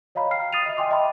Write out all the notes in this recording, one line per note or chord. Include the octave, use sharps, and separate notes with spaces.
C#5 D#5 F5 A#5 B5
F5 G5 F6 C7
D#6 F6 A6 C7 D#7 F7
D#5 E5
D#5 G5 G#5 C6 D6
D#5 E5 G5 A5 B5 C6